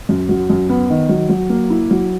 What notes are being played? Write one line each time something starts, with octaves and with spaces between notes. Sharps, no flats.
F#2
F#3
F#2
B3
D#3
F#3
F#3
A#3
E4
F#3